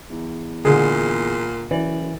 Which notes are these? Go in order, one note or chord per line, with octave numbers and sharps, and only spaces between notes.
E2
A#2 D3 G#3 G#4
F#1 E3 D5